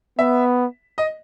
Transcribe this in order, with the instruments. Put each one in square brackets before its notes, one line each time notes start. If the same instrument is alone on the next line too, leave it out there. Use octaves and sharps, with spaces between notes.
[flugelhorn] B3 [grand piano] E5
[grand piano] D#5